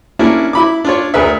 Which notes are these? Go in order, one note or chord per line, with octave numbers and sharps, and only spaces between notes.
A#3 C#4 D4 E4
E4 B5 D6
D4 F4 C#5
D2 G#4 A#4 B4 E5